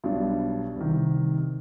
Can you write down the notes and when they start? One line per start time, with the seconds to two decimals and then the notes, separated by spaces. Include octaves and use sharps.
0.04 B1 B2 G3 D4
0.76 C2 C3 D#3